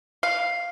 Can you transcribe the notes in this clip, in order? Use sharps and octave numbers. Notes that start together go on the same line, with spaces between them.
F5